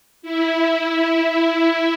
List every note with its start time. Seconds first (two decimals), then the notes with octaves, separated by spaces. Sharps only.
0.22 E4